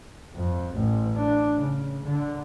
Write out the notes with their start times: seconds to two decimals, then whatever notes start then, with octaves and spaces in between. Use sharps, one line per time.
0.35 F2
0.74 A1
1.17 D4
1.60 C#3
2.03 D3